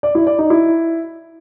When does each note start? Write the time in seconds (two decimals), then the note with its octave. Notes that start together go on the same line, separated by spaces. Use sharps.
0.03 D5
0.15 E4
0.27 D5
0.38 D#4
0.50 E4